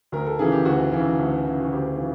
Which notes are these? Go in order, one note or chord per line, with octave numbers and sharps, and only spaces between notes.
D2 A#4
A4
C#3 E3 G#4
G4
D2 F#4
C#3 E3
D2
C#3 E3
F#4
D2 G4
C#3 E3